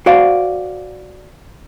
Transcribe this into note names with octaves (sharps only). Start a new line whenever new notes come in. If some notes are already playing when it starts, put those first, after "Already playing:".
F#4 C5 D5 F5